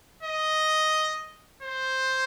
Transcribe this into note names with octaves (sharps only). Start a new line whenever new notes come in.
D#5
C5